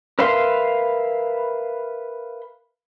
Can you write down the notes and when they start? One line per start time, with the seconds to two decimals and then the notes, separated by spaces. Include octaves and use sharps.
0.19 A#4 B4 E5 F5 C6